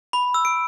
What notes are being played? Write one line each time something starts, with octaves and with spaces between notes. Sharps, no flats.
B5
E6
D7